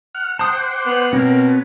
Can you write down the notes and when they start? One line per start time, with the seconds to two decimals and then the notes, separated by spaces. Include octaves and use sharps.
0.15 F#5 F6
0.39 C5 F#5 G5 A5 D#6
0.58 D6
0.86 B3
1.13 B2 C4 A#4 C#5
1.48 B3